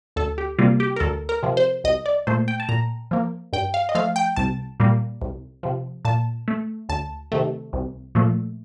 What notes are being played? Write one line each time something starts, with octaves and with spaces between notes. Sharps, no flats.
D2 A4
G4
C3 G3 A#3 F4
G4
A#4
D2 A4
A#4
C3 F3
C5
C2 D#5
D5
A#2 A3 C5
G5
A5
A#2 A#5
F3 A#3
G2 G5
F5
D#5
F3 A3 F5
G5
C2 A5
A#2 G3 A#3
C2
C3 F3
A#2 A5
A3
D2 A5
C3 D#3 A3
C2
A#2 F3 A3